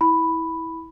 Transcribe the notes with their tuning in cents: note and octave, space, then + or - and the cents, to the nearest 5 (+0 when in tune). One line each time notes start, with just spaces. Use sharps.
E4 -20 B5 +0